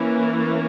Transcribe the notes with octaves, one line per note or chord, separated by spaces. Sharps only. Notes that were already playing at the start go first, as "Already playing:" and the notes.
Already playing: E3 A#3 C#4